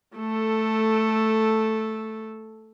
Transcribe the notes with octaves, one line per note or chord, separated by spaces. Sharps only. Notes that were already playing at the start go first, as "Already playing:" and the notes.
A3 A4